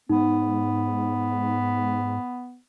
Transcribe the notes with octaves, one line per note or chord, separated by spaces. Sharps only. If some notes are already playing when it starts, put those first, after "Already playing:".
G#2 B3 D#4